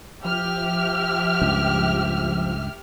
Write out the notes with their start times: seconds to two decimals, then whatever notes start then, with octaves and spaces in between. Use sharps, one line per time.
0.24 F3 G4 E5 F6
1.42 C#2 G2